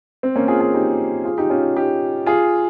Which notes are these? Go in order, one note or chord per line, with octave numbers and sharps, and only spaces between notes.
C4
A#3 C#4
F4 G#4
F4 G#4
D#4 G4
F4 G#4
D#4 G4
C#4 F4
D#4 G4
F4 G#4